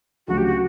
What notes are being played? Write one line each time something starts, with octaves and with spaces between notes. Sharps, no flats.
D2 C#3 F#3 F#4
G4
F#4